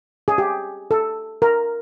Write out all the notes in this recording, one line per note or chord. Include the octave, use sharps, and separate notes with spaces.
G#4
G4
A4
A#4